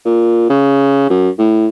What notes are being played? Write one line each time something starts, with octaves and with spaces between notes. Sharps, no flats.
A#2
C#3
F#2
A2